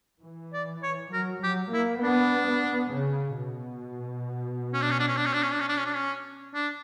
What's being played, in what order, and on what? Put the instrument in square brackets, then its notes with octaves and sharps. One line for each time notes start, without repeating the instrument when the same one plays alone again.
[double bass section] E3
[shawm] D5
C#5
[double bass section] F#3 [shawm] A#4
[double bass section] F#3 [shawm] G4
[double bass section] A#3 [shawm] E4
[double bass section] B3 [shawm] D4
[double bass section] B3
C#3
B2
[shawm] C#4
D4
C#4
D4
C#4
D4
C#4
D4
C#4
D4
C#4
D4
C#4
D4
C#4
D4